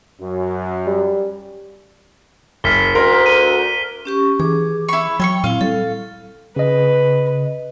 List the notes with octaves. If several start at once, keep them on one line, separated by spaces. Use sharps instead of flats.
F#2
G3
F#1 F6 B6 G7
D2 A#4 C6
D#7 G7
C#4 G4 C#6
E3 G#4 D6
E4 B5 C#6
F#3 C#5 E5 G5 C#6
A#2 C4 E4 F5
G3 A4
C#3 B4 D#5